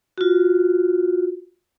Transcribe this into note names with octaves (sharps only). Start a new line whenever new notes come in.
F4 F#4